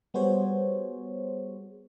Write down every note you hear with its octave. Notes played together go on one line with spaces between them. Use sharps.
G3 B3 F#4 G#4 C5 C#5